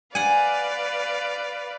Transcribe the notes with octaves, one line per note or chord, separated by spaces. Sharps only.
B4 D5 F5 F#5 G#5